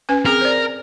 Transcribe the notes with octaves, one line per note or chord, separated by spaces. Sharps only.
C#4 B4 G#5
C4 G#4 A#4
C5 D5